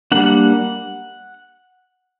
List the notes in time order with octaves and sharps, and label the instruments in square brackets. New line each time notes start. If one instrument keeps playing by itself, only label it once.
[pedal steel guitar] G3 A#3 D4 F#5